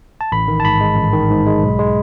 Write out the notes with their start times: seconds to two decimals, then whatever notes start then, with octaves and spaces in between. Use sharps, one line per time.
0.21 A5
0.32 A1 B5
0.48 D#3
0.60 A5
0.65 G#2 B5
0.81 G#3
0.96 A1
1.13 D#3
1.30 G#2
1.47 G#3
1.62 B1
1.79 G#3